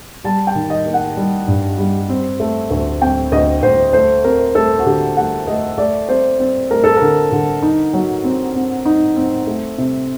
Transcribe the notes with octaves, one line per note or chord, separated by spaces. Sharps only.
G3 A5
G5
D#3
D#5
A#3
F#5
G3
G2
G3
C4
A3
D2
C4 G5
D2 D#5
D2 C5
A3 C5
C4 A#4
A3 A4
F#4
D3 G4
A3 F#5
A3 D#5
A3 D5
C4 C5
C4
A3 A#4
A4
D3 A#4
D3
D#4
F#3
C4
C4
D#4
C4
A3
C3